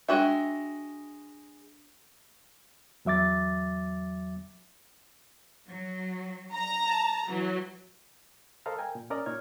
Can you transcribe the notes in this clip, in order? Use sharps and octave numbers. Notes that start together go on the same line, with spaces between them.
G#3 D4 F#4 E5 G5 F#6
E2 F#3 E5 D6 A6
F#3
A#5
A5
E3 F#3
A4 A#4 C5 D#5 F5 A#5
A#4 G5 G#5
A#2
C#4 A#4 D5 D#5 A#5
A#2 D#4 C#5 F6 G#6